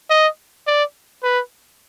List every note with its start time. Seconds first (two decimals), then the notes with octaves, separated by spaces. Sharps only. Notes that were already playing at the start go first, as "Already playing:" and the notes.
0.10 D#5
0.67 D5
1.23 B4